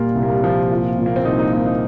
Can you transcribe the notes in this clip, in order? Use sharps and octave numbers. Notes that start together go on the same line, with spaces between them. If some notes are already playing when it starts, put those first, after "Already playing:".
Already playing: A#2 G3 A#3 F4
C2 G3
A#3
G3
F3 A#3
F4
A#2
A#3
C4
C2 D#4
D#4
A#3 D#4
D#4